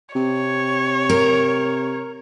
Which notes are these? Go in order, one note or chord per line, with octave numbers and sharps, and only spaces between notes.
C3 C#5
A#4